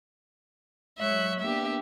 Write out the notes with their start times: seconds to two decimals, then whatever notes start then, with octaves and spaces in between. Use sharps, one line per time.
0.99 F#3 G#3 C#5 E5 F#6
1.40 A#3 B3 D4 G4 E5